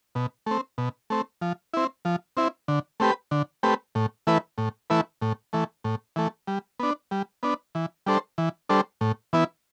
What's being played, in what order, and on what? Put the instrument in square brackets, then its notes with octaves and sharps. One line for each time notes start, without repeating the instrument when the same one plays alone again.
[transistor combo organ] B2
A3 C4
B2
A3 C4
F3
C4 E4
F3
C4 E4
D3
A3 C4 G4 B4
D3
A3 C4 G4 B4
A2
E3 A3 E4 B4
A2
E3 A3 E4 B4
A2
E3 A3
A2
E3 A3
G3
B3 D4
G3
B3 D4
E3
G3 D4 A4 C5
E3
G3 D4 A4 C5
A2
E3 B3 E4